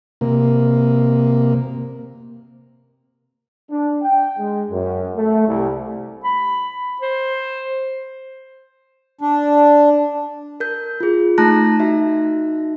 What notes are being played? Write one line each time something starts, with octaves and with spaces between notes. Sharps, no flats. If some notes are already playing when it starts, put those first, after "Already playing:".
C3 A#3
D4
G5
G#3
F#2
A3
C2
B5
C5
D4
A#4 G6
F4 G#4
A3 D#4 A5 A#5 F#6 A#6
D#4 F#4 E5